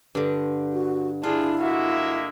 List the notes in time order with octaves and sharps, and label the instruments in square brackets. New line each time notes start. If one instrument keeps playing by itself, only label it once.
[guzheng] G2 D3
[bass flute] F#4
[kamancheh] D4 G#4 [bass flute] E4 [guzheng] F4
[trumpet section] G#3 A#3 E5 [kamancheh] F#4